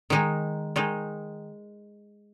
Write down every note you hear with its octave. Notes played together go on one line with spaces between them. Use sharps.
D#3 G#3 D#4
D#3 G#3 D#4